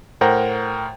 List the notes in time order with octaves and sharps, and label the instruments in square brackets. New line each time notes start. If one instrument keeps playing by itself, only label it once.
[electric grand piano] A2 A#4 C5 F#5 G5 A#5